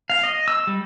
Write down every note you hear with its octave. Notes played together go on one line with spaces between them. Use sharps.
F5
D#5
E6
G3